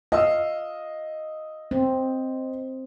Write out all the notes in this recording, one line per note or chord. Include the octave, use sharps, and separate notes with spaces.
D#5 F5 E6
C4